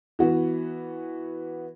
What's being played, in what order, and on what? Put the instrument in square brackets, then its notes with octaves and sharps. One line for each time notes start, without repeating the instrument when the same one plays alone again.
[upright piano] E3 B3 F#4